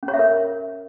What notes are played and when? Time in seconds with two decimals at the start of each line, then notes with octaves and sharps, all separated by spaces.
0.03 C#4
0.08 C#5
0.14 E5
0.19 A#4